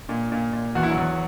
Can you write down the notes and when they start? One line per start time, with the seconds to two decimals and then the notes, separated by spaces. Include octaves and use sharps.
0.09 A#2
0.32 A#2
0.53 A#2
0.75 E2 F#4
0.83 E4
0.90 F#3 F#4
0.98 E2